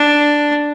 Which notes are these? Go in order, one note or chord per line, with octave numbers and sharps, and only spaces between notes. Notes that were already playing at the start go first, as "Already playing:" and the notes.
Already playing: D4